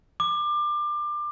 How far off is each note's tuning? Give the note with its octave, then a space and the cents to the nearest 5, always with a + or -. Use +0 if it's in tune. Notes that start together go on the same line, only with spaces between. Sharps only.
D6 +25